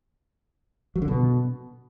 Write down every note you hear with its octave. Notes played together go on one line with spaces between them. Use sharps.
F#3
D3
B2